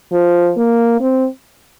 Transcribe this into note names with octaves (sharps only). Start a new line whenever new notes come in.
F3
A#3
C4